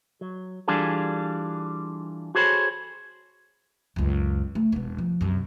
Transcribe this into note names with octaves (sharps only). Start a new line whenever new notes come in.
F#3
E3 G3 D4 F4 G#4 A4
F#4 G#4 A4 C5 C#5 B5
C#2 F#2
A3
E1 B3
F3
C2 F#2